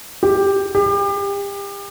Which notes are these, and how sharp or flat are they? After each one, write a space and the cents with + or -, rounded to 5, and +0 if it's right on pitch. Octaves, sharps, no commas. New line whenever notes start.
G4 +10
G4 +35